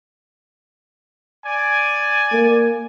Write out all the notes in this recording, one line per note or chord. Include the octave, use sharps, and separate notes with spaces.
D5 G#5
A#3